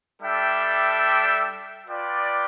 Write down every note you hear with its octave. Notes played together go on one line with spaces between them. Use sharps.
G3 D4 A4 E5 G5
F4 B4 D5 G5